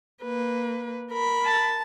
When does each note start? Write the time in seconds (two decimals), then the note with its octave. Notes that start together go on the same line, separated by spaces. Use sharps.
0.23 A#3 B4
1.11 A#4 B5
1.46 A5